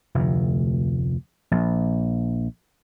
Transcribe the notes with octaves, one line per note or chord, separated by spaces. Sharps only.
F1 D2
A#1